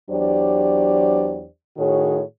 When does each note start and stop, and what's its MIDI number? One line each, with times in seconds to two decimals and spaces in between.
0.10 1.47 40
0.10 1.47 54
0.10 1.47 62
0.10 1.47 67
0.10 1.47 72
0.10 1.47 74
1.78 2.23 45
1.78 2.23 51
1.78 2.23 66
1.78 2.23 68
1.78 2.23 73